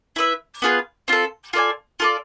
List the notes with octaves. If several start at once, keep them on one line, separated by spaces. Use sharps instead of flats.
E4 B4 E5
B3 F4 G#4 B4
C4 F4 A4
F4 A4 D5 G#5
F4 A4 D5